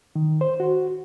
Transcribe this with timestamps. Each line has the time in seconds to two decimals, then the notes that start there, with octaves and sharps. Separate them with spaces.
0.16 D#3
0.41 C5
0.60 F#4